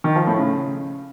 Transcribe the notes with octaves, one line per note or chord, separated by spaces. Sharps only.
D#3
F3
A2
C#3